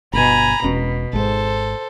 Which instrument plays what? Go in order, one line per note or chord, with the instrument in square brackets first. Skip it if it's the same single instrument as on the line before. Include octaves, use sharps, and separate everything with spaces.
[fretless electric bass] G1 B2 [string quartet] G#5 A#5 B5
[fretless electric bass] E1 C#4 [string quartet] B2
[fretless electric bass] G#1 G#2 [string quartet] A4 C5